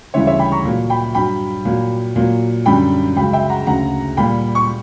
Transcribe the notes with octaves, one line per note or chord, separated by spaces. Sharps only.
D2 C#3 E3 G3 C#5 E5
C#5 E5
G5 B5
A#5 C#6
A#2 F#3
G5 B5
G2 F#3 G5 B5
A#2 F#3
A#2 F#3
F#2 D3 G3 G5 B5
C#2 C#3 F#3 G5 B5
E5 G5
F#5 A#5
D2 C#3 F#3 F#5 A#5
A#2 G3 G5 B5
C#6